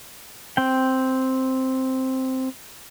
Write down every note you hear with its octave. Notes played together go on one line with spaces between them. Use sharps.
C4 G5